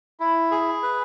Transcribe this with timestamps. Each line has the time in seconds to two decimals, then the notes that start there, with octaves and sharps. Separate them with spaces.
0.20 E4
0.51 G#4
0.83 B4